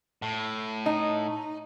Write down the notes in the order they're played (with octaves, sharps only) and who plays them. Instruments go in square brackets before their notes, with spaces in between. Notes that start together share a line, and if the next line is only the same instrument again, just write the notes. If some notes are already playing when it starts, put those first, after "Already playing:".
[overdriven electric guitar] A2
[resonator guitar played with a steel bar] D#4